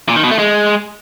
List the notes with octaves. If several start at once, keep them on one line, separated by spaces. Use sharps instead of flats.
A#2
D#3
B2
A3
G#3